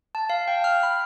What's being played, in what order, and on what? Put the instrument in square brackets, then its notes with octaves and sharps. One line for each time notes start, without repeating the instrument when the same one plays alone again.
[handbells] A5
F5
G5
F6
B5